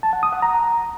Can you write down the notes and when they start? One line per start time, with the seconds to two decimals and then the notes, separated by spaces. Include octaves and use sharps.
0.03 A5
0.13 F#5
0.23 D#6
0.33 F#5
0.42 A#5